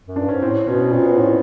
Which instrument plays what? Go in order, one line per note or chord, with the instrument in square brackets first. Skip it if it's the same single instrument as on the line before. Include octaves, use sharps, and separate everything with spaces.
[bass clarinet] F#2
[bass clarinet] G2 [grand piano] D4
[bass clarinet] G#2 [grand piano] C#4
[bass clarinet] A2 [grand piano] C4
[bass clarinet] B2 [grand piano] B3 C#4
[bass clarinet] A#2 [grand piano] C4
[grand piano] B3
[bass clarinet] A2